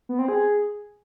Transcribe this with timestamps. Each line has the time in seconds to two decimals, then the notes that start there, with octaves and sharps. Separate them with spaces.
0.09 B3
0.19 C4
0.28 G#4